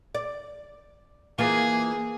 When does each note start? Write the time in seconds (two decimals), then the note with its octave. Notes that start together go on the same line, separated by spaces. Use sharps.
0.15 D5
1.38 E3 A#3 F4 G#4